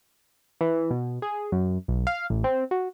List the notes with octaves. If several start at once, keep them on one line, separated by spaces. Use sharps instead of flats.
E3
B2
G#4
F#2
B1
F5
A1
C4
F#4